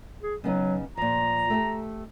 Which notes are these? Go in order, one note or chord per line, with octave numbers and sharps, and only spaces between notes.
G#4
C#3 F#3 B3 D#4
A#2 F3 A#5
A3 G4 A4